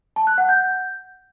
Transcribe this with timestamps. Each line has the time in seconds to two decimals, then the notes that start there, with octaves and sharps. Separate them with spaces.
0.16 A5
0.27 F#6
0.38 F#5
0.49 G6